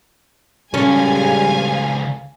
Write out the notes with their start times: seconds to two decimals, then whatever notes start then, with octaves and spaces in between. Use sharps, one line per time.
0.74 C#2 C#3 G3 C#4 A4 F5 G#5